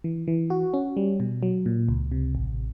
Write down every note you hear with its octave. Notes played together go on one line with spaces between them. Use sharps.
E3
E3
F#4
C#4
G3
B2
F#3
A#2
C#2
C3
A1